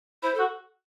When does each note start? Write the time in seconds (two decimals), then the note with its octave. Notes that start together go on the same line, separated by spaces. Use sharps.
0.23 E4 C5
0.35 A4
0.39 F#4